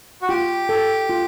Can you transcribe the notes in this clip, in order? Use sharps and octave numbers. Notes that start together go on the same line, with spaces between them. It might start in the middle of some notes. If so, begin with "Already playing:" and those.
F#4
F4 G4
A4
F4